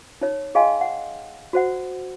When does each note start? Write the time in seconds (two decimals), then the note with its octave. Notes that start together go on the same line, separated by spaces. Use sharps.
0.21 D#4 C#5
0.55 G#4 D#5 F5 G5 G#5 C6
0.81 F#5
1.53 F#4 C5 F#5